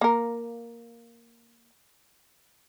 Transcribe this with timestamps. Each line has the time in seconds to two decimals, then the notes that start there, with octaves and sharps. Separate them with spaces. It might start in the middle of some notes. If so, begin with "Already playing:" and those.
0.01 A#3 A#4